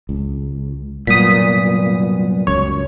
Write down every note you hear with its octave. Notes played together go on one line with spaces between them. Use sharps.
C#2
C2 F#2 A#2 B3 D#6 B6
C#2 F#2 C#5